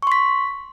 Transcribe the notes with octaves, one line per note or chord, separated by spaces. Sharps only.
C6 C#6 B6